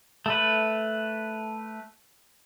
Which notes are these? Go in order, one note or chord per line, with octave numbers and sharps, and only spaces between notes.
A3 B4